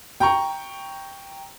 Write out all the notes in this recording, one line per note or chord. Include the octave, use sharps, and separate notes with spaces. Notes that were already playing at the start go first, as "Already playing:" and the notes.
G5 A#5 C#6